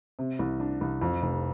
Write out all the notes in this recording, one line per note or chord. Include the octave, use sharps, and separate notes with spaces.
C3
C2
D4
C2
F2
F1